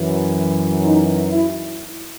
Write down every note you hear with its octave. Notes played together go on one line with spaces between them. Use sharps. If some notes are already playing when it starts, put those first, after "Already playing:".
Already playing: F#2 E3
D#4
E4